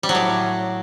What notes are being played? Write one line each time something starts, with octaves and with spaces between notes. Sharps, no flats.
G3
F#3
A2